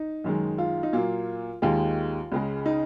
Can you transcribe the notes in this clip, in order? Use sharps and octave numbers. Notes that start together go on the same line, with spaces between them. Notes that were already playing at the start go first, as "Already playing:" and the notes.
Already playing: D#4
F#2 D#3 G#3
F4
D#4
A#2 F#3 A#3 F4
D#2 D#3 G#3 F4
C#2 C#3 G#3
D#4